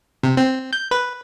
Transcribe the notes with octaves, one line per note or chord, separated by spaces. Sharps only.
C3
C4
G6
B4